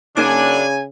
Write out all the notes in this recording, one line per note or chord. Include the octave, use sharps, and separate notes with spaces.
F#2 C#3 F#3 A#3 D4 D#4 G#5 D6